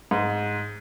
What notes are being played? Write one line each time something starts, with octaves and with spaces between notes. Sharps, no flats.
G#2